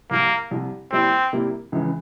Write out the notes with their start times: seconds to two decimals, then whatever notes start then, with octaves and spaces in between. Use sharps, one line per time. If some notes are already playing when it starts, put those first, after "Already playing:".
0.10 C2 C3 G3 A#3
0.51 C2 C3 G3
0.92 C3 G3 A#3 C4 E4
1.33 C3 G3 A#3 E4
1.72 C#2 C#3 E3